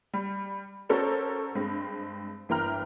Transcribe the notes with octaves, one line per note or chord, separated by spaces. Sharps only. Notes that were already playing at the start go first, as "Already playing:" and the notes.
G3
C#4 F#4 A4 A#4 C5 D5
G2 G#3 C4
G1 E3 A#3 G5 A#5 F6